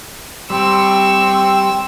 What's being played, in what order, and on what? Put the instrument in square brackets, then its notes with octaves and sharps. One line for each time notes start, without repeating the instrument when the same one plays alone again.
[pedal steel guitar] G3 [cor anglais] C4 [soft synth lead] G5 [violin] C#6 E6